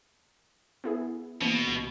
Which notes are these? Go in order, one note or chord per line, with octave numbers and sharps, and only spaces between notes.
B3 E4 G#4
B2 E3 A#3 B3
C#2